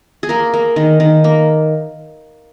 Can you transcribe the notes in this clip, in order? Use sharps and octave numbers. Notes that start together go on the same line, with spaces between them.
G#4
A#3 A#4
A#3
D#3
D#3
A#3